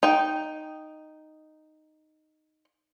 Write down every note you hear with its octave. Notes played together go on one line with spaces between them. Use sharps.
D#4 G5